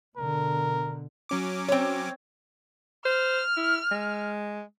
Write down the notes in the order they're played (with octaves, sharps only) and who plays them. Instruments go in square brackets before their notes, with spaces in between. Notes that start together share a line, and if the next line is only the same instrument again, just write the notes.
[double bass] B2 D3 [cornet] A#4
[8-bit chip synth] F#3 C#4 D6
[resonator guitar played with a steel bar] C4 C#5
[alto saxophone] C5 [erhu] F6
[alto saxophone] E4
G#3